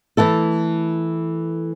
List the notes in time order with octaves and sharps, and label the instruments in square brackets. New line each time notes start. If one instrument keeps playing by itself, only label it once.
[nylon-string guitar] E3 A3 E4 A4